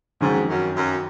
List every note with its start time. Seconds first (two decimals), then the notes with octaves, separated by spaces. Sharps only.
0.21 F2 G#2 D#3 F#3 C#4
0.48 F#2
0.76 F#2